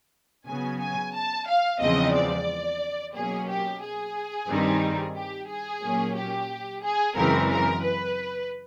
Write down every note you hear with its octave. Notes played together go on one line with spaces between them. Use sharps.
C#3 F#3 B3 G#5
G#5
A5
F5
E2 C#3 F3 G#3 C4 D#5
D5
B2 F#3 A#3 C#4 G#4
G4
G#4
G2 D#3 G3 C4 D#4
G4
G#4
A#2 F#3 A#3 C#4
G4
G#4
F#2 C#3 E3 G#3 C4 A#4
A#4
B4